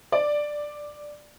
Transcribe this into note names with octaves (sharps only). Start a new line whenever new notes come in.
D5